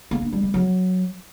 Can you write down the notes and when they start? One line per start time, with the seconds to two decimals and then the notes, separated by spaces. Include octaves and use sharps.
0.11 A#3
0.22 D4
0.33 G3
0.43 G3
0.54 F#3